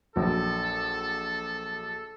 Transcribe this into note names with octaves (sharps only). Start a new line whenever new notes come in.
A#1 F#3 A4